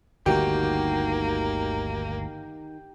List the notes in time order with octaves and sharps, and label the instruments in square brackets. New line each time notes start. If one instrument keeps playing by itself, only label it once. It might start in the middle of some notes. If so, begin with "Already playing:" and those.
[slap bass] G1 D2 [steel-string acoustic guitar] D#3 D#4 F#4 [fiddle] A#3 [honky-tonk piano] G4